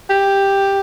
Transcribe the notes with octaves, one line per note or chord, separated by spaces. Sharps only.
G4